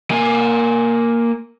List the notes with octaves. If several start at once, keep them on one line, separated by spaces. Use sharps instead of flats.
A#3 G#5